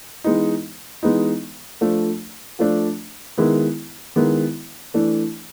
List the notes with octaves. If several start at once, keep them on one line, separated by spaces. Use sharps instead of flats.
E3 G#3 B3 D#4
E3 G#3 B3 D#4
F3 A3 D4
F3 A3 D4
D#3 G#3 B3 E4
D#3 G#3 B3 E4
E3 A3 D4